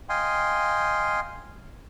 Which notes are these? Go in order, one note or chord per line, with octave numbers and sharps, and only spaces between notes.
D#5 F5 G5 G#5 C6